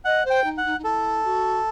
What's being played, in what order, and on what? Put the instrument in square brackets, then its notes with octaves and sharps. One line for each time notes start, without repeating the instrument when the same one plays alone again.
[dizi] D#5 [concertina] F#5
[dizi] C5
[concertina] G5
[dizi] D#4
[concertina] F#5
[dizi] D#4
D#4
[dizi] E4 [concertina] A4
[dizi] F#4